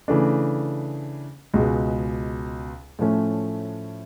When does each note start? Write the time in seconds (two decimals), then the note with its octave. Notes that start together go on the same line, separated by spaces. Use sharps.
0.08 C#3 E3 A3 D4
1.54 C#2 B2 G#3
2.99 A2 F3 A3 C#4